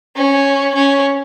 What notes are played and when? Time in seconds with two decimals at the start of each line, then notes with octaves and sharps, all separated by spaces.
0.16 C#4
0.75 C#4